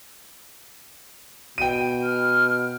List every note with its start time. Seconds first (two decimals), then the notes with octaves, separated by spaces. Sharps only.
1.58 B2 G5 D#7
2.03 F6